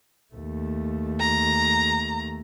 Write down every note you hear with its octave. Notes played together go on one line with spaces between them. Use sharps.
D#2 A3
A#5